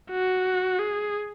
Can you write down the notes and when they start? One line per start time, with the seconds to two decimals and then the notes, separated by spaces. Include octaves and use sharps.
0.11 F#4
0.79 G#4